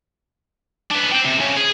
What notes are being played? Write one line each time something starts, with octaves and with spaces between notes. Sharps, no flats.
B3 D4
C5 G5
C3
C#3
G#4